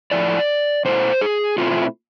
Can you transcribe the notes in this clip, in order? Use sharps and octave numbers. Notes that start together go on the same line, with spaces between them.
A2 F3 A3 E4 D5
B2 A3 E4 C5
G#4
B2 A3 C4 E4 F4